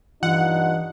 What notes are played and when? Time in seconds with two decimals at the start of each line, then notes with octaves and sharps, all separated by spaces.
0.23 G2 E3 D#4 F4 F#5